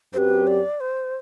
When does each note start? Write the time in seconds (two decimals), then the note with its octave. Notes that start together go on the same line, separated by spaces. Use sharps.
0.13 F#2 F#3 C4 G4 B4 C5
0.47 D5
0.80 C5